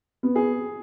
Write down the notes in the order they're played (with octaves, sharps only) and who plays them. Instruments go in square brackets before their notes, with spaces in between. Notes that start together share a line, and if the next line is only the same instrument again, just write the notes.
[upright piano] B3
[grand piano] G#4